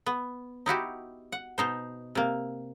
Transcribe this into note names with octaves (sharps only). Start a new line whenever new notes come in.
B3
D#4 E4 F#4 G4
F#5
B2 D#4 C5
C3 A#3